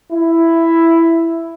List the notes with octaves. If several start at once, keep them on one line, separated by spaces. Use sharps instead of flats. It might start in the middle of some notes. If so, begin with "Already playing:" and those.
E4